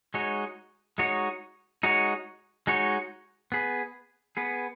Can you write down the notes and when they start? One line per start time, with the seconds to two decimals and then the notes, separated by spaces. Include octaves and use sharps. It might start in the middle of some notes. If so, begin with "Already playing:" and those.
0.14 G#3 D#4 F#4 C#5
0.98 G#3 D#4 F#4 C#5
1.83 G#3 D#4 F#4 C#5
2.67 G#3 D#4 F#4 C#5
3.52 B3 G#4 B4
4.37 B3 G#4 B4